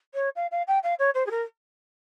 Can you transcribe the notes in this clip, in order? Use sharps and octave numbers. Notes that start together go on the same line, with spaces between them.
C#5
F5
F5
G5
F5
C#5
C5
G#4
A#4